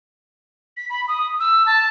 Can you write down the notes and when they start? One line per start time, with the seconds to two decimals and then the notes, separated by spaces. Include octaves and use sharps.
0.77 B6
0.90 B5
1.08 D#6
1.40 E6
1.66 A5